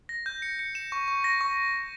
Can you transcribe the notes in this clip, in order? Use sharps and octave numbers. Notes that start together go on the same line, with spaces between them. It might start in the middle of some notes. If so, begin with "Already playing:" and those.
A#6
G6
C#7
C#7
E7
C#6
C#6
A#6
C#6